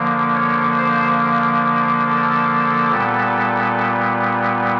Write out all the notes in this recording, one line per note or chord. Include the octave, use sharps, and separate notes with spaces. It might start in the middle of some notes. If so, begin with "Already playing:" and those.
Already playing: D3 F3 A#3
C#5
C5
A4
A#2 G3 B3